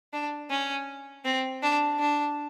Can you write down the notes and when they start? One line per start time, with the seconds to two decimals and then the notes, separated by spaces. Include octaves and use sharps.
0.13 D4
0.51 C#4
1.25 C4
1.63 D4
2.00 D4